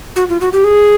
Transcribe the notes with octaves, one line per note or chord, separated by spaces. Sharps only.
F#4
F4
F#4
G4
G#4